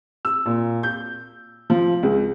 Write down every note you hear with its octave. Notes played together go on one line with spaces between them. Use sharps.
E6
A#2
G6
F3
C#2